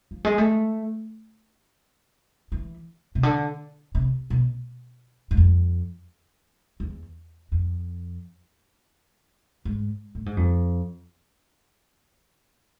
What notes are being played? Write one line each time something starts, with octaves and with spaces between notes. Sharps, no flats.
F3
G#3
A3
E3
C3
D3
C3
B2
G#2
F2
E2
F2
G#2
A2
G#2
F2